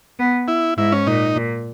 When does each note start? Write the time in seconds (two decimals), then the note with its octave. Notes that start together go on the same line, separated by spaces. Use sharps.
0.19 B3
0.48 E4
0.78 G#2 E4
0.92 C#4
1.07 A#2 D#4
1.35 A#2